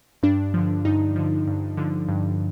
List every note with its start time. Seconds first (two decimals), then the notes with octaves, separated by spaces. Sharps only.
0.23 G2 D4
0.54 D3 F3
0.85 G2 D#4
1.16 D3 F3
1.47 G2
1.77 D3 F3
2.08 G2